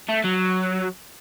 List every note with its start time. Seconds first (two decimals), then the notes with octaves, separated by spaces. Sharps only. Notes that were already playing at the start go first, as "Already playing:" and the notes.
0.09 A3
0.24 F#3